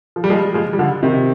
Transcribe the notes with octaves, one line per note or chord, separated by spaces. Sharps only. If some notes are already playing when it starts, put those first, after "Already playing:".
F3
G3
F3 G#3
F3 G#3
G3
D3 F3
C3 D#3